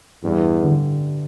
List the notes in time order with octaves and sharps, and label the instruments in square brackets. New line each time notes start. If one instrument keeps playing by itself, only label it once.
[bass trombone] E2 [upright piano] G2
[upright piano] D3